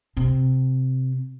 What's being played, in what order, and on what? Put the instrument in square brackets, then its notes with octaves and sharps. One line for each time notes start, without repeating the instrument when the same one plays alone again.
[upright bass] C3 C4